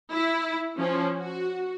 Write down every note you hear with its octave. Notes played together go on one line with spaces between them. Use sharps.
E4
F3 C#4
F#4